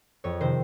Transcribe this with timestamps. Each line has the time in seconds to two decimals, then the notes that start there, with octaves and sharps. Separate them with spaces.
0.24 F2 C#5
0.41 C3 D#3 C5